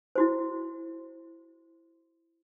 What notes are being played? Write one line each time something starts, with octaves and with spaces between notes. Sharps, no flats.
E4 F#4 C5